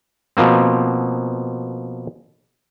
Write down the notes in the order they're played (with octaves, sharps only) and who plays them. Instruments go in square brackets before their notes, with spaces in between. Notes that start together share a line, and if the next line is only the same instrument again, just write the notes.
[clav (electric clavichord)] B2 F3 A#3 C4